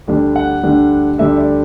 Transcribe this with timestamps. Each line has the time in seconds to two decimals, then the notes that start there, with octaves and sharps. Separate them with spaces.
0.07 D2 D3 G3 D4
0.36 F#5
0.63 D2 D3 G3 D4
1.18 D2 D3 G3 D4 E5
1.37 D5